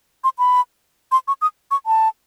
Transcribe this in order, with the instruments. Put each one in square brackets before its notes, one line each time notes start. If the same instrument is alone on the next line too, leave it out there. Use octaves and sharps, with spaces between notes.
[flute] C6
B5
C6
C#6
D#6
C#6
A5